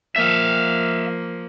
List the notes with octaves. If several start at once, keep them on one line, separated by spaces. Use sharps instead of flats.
F3 A#3 E5 F5